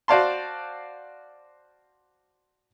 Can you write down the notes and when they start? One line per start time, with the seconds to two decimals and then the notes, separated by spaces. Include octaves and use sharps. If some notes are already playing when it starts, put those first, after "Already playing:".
0.08 F#4 C5 D5 F5 A5 C6